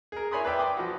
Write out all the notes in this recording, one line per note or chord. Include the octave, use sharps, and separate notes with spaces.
G#4 A#4
E4 C#5 G#5 B5 C6 D#6
B4 D5 E5 G5
G5 C6 D6 D#6
F3 F#4